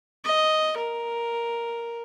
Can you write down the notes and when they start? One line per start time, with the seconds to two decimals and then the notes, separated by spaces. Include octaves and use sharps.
0.24 D#5
0.77 A#4